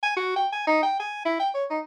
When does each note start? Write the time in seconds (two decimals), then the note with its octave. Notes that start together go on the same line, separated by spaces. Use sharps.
0.03 G#5
0.17 F#4
0.36 G5
0.52 G#5
0.67 D#4
0.83 G5
1.00 G#5
1.25 E4
1.40 G5
1.54 C#5
1.70 D#4